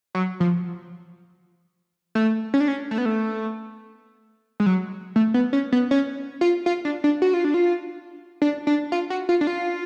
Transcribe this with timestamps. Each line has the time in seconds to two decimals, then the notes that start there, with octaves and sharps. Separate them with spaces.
0.15 F#3
0.40 F3
2.15 A3
2.54 C#4
2.60 D4
2.68 C#4
2.91 A3
2.98 B3
3.06 A3
4.60 G#3
4.66 F#3
5.16 A3
5.34 B3
5.53 C#4
5.72 B3
5.91 C#4
6.41 F4
6.66 F4
6.85 D4
7.04 D4
7.22 F#4
7.34 F4
7.45 D4
7.54 F4
8.42 D4
8.67 D4
8.92 F4
9.10 F#4
9.29 F4
9.41 D4
9.47 F4